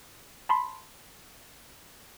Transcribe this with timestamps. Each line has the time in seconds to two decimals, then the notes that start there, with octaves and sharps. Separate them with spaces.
0.49 A5 B5 C6